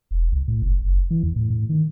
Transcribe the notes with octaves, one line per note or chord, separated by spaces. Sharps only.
E1
C2
A2
F#1
F#1
E3
E2
A2
A2
D#3